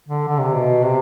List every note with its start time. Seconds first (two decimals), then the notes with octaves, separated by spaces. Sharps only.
0.08 D3
0.29 D3
0.39 C3
0.54 B2
0.85 C3